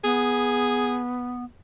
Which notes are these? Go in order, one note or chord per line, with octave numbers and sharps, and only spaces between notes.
B3 G#4